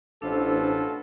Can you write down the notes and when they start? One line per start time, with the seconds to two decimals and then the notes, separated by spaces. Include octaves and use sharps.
0.22 A1 B2 D4 F4 A4 C5 E6